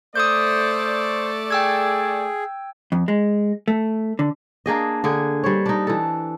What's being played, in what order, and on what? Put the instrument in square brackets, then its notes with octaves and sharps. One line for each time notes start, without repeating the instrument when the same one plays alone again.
[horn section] A3 D5 [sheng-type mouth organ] C5 [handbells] D#6 G6
[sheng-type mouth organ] G#4 [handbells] G5 E6 G#6
[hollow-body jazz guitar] F2
G#3
A3
D3
[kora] A#3 D4 G#4 D#5
D3 G#4
G3 C5 C#5
D4 D#4
E3 A4